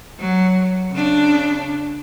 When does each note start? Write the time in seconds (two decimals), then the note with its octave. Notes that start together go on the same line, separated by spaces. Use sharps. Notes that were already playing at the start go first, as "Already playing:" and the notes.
0.19 F#3
0.91 C#3 D4